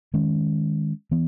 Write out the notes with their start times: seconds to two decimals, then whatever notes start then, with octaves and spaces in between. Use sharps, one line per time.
0.14 D#3 G#3 C#4
1.11 E3 B3